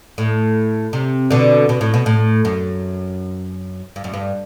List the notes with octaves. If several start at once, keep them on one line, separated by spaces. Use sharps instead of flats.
A2
C3
B2 D3
B2
A2
B2
A2
F#2
G2
F#2
G2